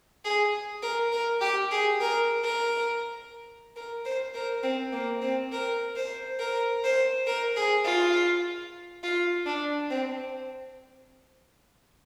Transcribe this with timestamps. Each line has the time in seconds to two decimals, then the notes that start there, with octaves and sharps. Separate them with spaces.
0.25 G#4
0.83 A#4
1.12 A#4
1.41 G4
1.71 G#4
2.01 A#4
2.44 A#4
3.76 A#4
4.05 C5
4.34 A#4
4.63 C4
4.93 A#3
5.22 C4
5.52 A#4
5.96 C5
6.40 A#4
6.84 C5
7.27 A#4
7.57 G#4
7.85 F4
9.04 F4
9.46 D4
9.91 C4